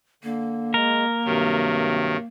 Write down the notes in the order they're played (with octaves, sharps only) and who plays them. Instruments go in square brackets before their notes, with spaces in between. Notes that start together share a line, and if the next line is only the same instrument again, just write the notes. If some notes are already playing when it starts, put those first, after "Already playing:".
[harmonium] D3 [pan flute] A#3
[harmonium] G#3 [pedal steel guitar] A#4
[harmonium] G2 C3 F#3 [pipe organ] D#3